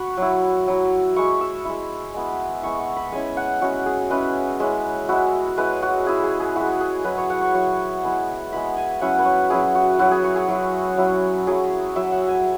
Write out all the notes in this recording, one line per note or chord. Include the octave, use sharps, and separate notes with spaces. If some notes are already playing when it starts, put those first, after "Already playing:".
Already playing: F#4 B5 C#6
F#3 E4
F#3 E4
G#3 E4 C#6
E6
G#3 E4
G#3 B3 E4
G#3 B3 E4 C#6
C#6
B5
G#3 C#4 E4 G#5
F#5
G#3 C#4 E4 F#4
G#4
G#3 C#4 E4 B4
G#3 C#4 E4
G#3 E4 F#4
G#3 E4 B4
F#4
G#3 E4 G#4
G#4
G#4
G#3 E4 F#4
G#4
F#3 E4 B4
C#5
F#5
C#6
F#3 E4 C#6
G#3 B3 E4
G#3 B3 E4 B5
G#5
F#3 C#4 E4 F#5
B4
C#5
F#3 C#4 E4 G#4
F#4
F#3 E4 F#4
G#4
C#5
G#4
F#3 E4
F#3 E4
F#3 E4 G#4
F#3 E4 E5
F#5
G#5